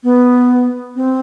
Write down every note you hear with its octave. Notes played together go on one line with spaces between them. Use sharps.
B3
C4